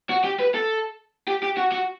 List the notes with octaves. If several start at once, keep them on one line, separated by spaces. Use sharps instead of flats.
F#4
G4
B4
A4
G4
G4
F#4
F#4